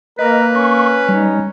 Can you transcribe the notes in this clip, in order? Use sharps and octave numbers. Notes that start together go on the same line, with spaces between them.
A#3 A#4 B4 D#5
C#4 C#6
G3 D#4